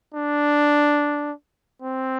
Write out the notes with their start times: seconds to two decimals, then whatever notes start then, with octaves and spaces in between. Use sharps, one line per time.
0.14 D4
1.82 C4